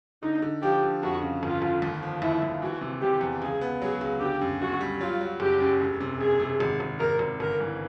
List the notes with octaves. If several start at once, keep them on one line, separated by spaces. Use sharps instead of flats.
D3 D#4
D3
F3 G4
D3
F2 F#4
C#3
G1 F4
G1
D#2
F3
D#2 E4
D#2
E3 F#4
C3
C3 G4
E2
C#2 G#4
B3
F#3 G#4
C#2
D3 G4
F#2
F#2 F#4
G3
F#3 F4
F#3
F#1 G4
F#2
E1
C3
E1 G#4
C3
G#1
G#1
G#1 A#4
G#1
G1 A#4
E3